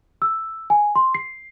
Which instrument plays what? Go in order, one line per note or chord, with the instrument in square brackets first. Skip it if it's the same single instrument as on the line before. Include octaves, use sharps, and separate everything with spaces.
[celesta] E6
G#5
C6
C7